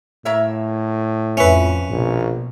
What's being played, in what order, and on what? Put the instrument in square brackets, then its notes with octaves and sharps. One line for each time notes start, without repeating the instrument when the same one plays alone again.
[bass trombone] A2 [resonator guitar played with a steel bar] A#3 C#5 E5
[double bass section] F2 [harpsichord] C#4 B4 [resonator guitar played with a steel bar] E5
[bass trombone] A#1 [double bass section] B2